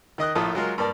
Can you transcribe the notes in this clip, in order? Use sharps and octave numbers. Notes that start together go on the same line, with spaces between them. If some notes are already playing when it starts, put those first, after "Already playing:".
D#3 D#5 D#6 F#6
A#1 A2 A3 F4 A5 D#6
F#3 G#3 F4 A#4
G2 A#3 D5 A5